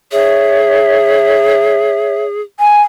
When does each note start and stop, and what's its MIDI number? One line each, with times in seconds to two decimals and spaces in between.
0.12 2.41 68
0.12 2.21 73
0.12 2.21 76
2.60 2.82 80